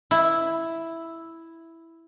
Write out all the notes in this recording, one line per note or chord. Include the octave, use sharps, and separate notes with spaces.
E4